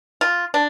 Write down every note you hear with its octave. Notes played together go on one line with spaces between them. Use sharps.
F4
D4